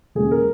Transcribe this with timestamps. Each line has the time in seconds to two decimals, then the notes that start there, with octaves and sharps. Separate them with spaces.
0.15 E1 D#2 C#3 G#3 G#4
0.31 A#4